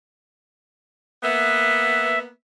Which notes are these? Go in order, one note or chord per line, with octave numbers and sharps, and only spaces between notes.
A#3 B3 E5